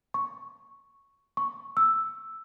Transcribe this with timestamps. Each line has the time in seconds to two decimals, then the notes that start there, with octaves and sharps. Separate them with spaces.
0.14 C#6
1.37 C#6
1.77 E6